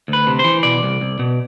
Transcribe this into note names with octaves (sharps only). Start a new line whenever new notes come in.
D2
B4
C3
C5
E3
B2 D5
C2
C2
B2